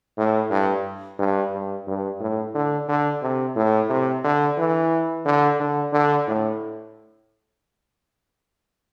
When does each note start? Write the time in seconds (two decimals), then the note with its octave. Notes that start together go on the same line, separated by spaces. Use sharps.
0.18 A2
0.50 G2
1.19 G2
1.53 G2
1.87 G2
2.20 A2
2.55 D3
2.88 D3
3.22 C3
3.56 A2
3.90 C3
4.24 D3
4.58 E3
5.25 D3
5.59 D3
5.93 D3
6.27 A2